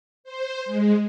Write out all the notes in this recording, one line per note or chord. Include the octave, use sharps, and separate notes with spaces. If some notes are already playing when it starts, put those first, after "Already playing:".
C5
G#3